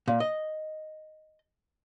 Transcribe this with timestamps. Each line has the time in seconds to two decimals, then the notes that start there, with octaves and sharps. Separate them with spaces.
0.08 A#2
0.20 D#5